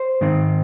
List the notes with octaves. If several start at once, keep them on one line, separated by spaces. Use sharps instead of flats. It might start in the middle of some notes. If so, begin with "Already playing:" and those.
Already playing: C5
G#2 D#3 C4